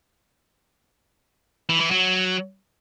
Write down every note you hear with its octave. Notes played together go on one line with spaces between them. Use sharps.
E3
E3
F#3